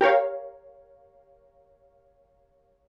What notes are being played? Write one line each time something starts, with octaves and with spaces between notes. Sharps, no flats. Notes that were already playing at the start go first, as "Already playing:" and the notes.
G4 A#4 C#5 F5